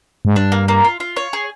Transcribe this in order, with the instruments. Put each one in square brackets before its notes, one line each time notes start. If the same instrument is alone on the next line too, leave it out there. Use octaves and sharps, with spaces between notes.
[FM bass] G#2
[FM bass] G2 [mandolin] D4
[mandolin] A#3
A#3
F4
F4
C#5
G#4